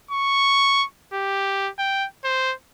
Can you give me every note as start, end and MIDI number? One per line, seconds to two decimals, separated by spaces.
0.11 0.85 85
1.13 1.70 67
1.79 2.06 79
2.25 2.54 72